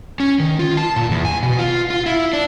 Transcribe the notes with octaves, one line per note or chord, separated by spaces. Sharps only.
C#4
D#3
F4
A5
A#2
E2
G#5
B2
F4
F4
E4
D4